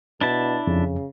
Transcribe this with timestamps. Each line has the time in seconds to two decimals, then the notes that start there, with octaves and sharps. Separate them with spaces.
0.21 B2 D4 E4 A5
0.67 F2 C#3